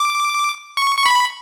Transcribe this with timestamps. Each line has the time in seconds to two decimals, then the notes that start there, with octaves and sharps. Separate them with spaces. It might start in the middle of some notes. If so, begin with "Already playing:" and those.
Already playing: D6
0.77 C#6
0.98 C#6
1.06 B5